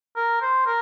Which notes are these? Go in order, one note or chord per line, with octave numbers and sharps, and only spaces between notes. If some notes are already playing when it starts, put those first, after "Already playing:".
A#4
C5
A#4